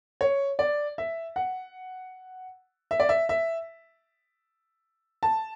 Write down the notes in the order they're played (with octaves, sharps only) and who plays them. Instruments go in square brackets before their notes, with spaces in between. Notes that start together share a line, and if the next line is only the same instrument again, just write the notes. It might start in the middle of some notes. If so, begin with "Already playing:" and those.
[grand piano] C#5
D5
E5
F#5
E5
D5
E5
E5
A5